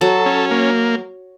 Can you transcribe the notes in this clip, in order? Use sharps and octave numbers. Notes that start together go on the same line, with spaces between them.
F#3 A4
C#4
A#3